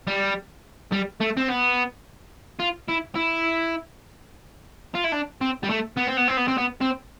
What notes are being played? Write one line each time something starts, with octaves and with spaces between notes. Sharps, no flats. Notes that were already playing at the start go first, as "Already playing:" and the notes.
G3
G3
A3
C4
B3
F4
E4
E4
F4
E4
D4
C4
G3
A3
B3
C4
B3
C4
B3
C4
B3
C4